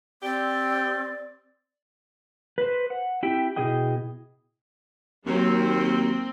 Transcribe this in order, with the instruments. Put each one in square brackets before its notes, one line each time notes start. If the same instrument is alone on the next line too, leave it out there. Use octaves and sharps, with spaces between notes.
[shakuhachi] C4 [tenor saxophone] G4 [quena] D5
[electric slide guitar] B4 C5
F#5
C4 E4 G4 E5 G5
B2 E4 G#4 D#5 G5
[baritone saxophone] D#2 [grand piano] D#3 F#3 [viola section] A#3 C4